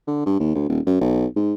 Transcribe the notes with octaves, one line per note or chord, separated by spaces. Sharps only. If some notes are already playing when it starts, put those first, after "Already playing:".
D3
G2
D#2
D2
D#1
F#2
B1
G#2